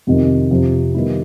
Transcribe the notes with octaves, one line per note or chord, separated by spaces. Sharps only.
F2 C3 D#3
F2 C3 F3
D#3 G3 B3 E4